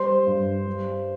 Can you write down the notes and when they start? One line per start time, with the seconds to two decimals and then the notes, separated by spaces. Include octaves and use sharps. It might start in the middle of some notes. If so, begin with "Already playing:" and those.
Already playing: G3 C5 C6
0.27 G2
0.66 G3